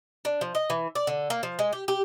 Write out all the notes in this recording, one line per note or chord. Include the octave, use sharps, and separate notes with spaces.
D4
F3
D#5
E3
D5
D3
A#3
F3
G#3
G4
G4